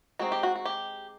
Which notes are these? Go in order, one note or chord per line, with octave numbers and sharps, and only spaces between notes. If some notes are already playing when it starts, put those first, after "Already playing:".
G#3 C4 D#4 F#4
G4
F#4
F#4
G4